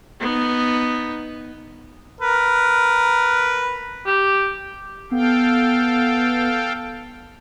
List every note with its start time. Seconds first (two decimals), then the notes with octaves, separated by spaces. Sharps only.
0.21 B3 D#4
2.21 A#4 B4
4.06 G4
5.11 B3 A4 F5 G5